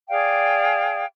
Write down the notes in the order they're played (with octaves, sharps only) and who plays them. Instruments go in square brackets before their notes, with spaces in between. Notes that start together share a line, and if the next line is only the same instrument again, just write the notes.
[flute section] G#4 D5 F5 G5